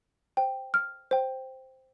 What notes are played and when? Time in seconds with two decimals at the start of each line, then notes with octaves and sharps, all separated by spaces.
0.37 C5 G5
0.74 F6
1.11 C5 G5